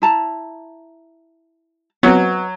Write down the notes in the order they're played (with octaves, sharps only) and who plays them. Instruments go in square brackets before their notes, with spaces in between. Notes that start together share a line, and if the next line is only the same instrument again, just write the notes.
[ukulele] E4 A5 A#5
[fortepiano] F#3 [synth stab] B3 C4 [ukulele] B4 D#5 F#5